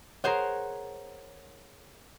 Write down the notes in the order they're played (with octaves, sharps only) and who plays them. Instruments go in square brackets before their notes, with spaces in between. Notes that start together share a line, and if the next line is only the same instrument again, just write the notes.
[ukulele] G#4 C5 C#5 [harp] A#4 F#5